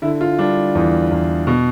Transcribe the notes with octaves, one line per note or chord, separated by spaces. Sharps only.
D3 E4
F4
G3 D4
E2
E2
B2